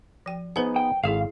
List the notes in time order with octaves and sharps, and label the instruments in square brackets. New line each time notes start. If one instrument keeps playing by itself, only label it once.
[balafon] F3 G5
[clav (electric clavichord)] B3 D#4 G#4 [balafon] B4 C5 F#5
[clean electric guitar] G5
[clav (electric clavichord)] G#1 [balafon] E4 G#4 A4 [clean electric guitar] F5